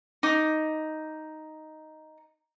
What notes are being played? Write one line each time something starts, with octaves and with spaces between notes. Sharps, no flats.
D#4 D6